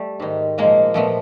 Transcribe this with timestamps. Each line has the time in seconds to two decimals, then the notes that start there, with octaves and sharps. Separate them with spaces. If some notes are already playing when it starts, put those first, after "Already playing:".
Already playing: G3 A3
0.20 G#2 D#3
0.58 A#2 F3 G#3 A#3
0.94 A#2 F3 A3 B3